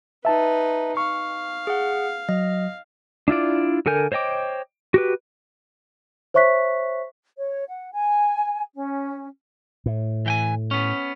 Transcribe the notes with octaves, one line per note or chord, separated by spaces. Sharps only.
D#4 B4 E5 A5
F5 C#6
G#4 F#5
F#3 D#5
D4 E4 F4 D5
D3 A4 A#4 G#5 G6
C5 C#5 D#5 G5 D6
F#4 G4 B4
C5 C#5 E5 C#6 F#6 B6
C#5
F#5
G#5
C#4
A2
E3 G5 G#5
B3 C#4